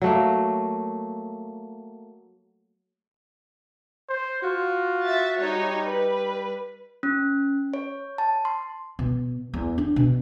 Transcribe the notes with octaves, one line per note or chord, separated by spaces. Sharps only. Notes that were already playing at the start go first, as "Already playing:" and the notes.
F#3 A3 A#3
C5
F4 F#4
E5 A6
G3 D#4 C#5
B4
C#4
C#5
A5
C6
B2
E2
D4
B2